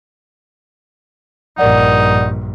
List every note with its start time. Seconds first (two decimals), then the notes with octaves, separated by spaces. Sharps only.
1.58 A#1 G2 D#4 A#4 D5 F#5